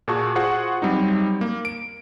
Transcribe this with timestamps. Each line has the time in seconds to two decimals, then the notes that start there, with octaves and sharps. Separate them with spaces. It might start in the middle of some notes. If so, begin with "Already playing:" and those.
0.08 A#2 F#4 G#4 A5 C#6
0.35 F4 F#4 G#4 C5 F#5 C#6
0.82 F#3 G3 C4 D#4
1.41 A#3
1.65 D7